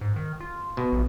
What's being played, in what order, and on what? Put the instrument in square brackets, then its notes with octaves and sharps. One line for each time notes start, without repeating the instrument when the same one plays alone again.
[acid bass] G#2
D#3
F4
[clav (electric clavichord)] B2
[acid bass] A#1